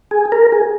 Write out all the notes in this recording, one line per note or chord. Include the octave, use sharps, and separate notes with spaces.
G#4
A#4
G#4